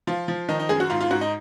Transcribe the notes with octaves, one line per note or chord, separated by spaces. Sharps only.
F3 F4
F3
D#3 D#4
D#4
F#2 G#4
F#4
G#2 F4
F4
G#2 F#4
D#4